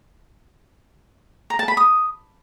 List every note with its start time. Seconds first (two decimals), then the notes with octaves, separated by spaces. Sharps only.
1.50 A#5
1.59 A5
1.68 B5
1.77 D#6